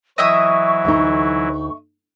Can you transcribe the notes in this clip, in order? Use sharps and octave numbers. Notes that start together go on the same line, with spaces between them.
E3 F#3 E4 D#5 E5 C#6 D#6
D2 D#4